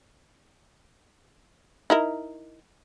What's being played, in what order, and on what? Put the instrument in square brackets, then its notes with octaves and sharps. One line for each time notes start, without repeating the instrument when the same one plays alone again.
[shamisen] D#4 E4 A#4